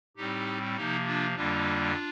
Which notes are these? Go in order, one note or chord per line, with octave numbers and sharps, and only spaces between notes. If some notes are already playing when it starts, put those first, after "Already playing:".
A2 G3 C4 D#4 G4
C3 F3 A#3 D#4 G4
D4 F4
F2 D3 G3 A#3 D4 F4